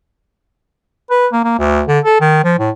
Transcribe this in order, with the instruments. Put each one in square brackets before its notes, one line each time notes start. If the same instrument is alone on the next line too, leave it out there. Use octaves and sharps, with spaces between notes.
[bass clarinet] B4
A#3
A#3
D2
D3
A4
D#3
F3
A2